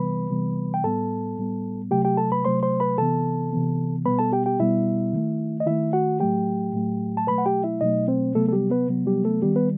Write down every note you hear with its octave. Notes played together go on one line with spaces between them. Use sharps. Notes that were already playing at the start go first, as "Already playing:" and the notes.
Already playing: C3 E3 G3 B3 B4 B5
C3 E3 G3 B3
G5
A2 G3 B3 A4 A5
A2 G3 B3
C3 F#3 A3 G4 G5
G4 G5
A4 A5
B4 B5
C3 F#3 A3 C5 C6
C5 C6
B4 B5
C3 E3 B3 A4 A5
C3 E3 B3
B2 G3 B3 B4 B5
A4 A5
G4 G5
G4 G5
B2 G3 B3 E4 E5
D#3 A3
D#5
D#3 A3 E4 E5
F#4 F#5
A2 F#3 A3 G4 G5
A2 F#3 A3
A5
B2 F#3 A3 B4 B5
F#5
G4 G5
E4 E5
B2 F#3 A3 D#4 D#5
C4 C5
C3 F#3 A3 B3 A4
A4
G3 G4
B3 B4
C3 F#3 B3
G3 G4
A3 A4
D#3 G3 B3 G4
B3 B4